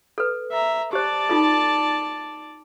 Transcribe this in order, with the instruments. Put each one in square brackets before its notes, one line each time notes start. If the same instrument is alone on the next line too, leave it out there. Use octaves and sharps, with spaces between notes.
[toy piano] A4 B4
[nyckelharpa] E5 A#5
[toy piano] G4 C5 [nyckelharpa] D5 A5
[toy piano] D#4 F4 A4